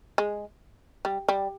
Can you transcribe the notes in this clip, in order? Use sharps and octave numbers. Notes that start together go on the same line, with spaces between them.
G#3
G3
G3